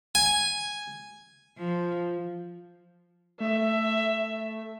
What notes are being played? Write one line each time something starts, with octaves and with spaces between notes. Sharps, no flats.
G#5
F3
A3 E5